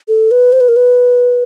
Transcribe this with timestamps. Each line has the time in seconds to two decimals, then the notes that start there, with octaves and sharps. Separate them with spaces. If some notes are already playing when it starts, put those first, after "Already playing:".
0.08 A4
0.31 B4
0.53 C5
0.61 B4
0.68 A#4
0.76 B4